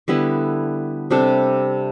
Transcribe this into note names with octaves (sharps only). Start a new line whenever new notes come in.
D3 G3 B3 E4
C3 G3 D4 A4